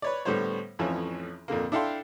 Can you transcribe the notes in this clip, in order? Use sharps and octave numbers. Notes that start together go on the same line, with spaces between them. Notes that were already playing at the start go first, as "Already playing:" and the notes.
B4 C#5 D5
A2 D3 G3 B3 C5 C#5
A1 F2 E3 F3 C#5
F2 A#2 D3 A#3
D4 E4 A4 F5 G5 C6